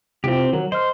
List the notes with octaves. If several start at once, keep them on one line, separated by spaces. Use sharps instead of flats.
C3 C4 E4 F4 G4
D#3 F#3 A#4
C5 D#5 F6